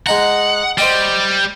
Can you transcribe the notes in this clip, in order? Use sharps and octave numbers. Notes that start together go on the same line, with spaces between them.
G#3 D#4 F#5 A#5
G3 C5 D#5 G5